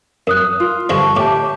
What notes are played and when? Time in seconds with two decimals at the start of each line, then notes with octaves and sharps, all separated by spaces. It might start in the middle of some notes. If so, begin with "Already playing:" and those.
0.27 F#2 A#4 D#6 F#6
0.60 F4
0.89 G2 D3 F3 D#5 A5 C#6
1.17 A2 G4 E5 G5 A5 D6